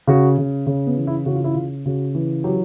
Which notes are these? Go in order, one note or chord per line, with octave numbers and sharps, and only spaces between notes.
C#3 F#4
C#3
C#3
B3
E3
E4
C#3 F#4
F4
E4
C#3 F4
C#3 F#4
E3
F#3 G4